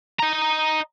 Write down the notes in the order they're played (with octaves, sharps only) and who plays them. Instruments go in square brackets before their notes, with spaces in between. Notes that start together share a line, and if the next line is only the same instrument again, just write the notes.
[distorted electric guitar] D#5 A#5